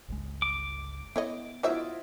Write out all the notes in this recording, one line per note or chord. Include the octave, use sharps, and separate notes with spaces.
G1 C#2 G#3
D6
B3 E4 C#5 D#5
F#3 E4 F4 C5 D#5 E5